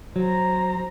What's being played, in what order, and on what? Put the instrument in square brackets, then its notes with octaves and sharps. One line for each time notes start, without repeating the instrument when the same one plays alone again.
[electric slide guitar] F#3 [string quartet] C5 A#5